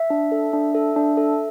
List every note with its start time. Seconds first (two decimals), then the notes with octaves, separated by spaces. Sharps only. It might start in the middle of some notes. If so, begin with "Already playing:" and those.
Already playing: E5
0.10 D4
0.32 A4
0.53 D4
0.74 A4
0.96 D4
1.17 A4